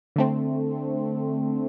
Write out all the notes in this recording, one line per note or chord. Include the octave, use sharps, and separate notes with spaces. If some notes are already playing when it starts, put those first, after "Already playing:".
D3 A3 C4